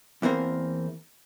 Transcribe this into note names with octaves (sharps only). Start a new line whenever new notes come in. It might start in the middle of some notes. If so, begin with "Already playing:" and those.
E2 E3 A#3 C4 A#4